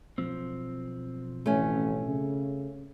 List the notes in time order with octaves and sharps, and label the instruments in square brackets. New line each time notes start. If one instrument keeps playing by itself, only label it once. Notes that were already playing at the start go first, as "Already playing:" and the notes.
[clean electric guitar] B1 F3 C4
[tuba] A1 [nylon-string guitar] A3 C#4
[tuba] C#3